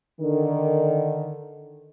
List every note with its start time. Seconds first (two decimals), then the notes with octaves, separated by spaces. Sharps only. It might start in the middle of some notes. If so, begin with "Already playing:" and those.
0.20 D3 D#3